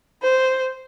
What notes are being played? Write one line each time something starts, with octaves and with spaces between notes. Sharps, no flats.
C5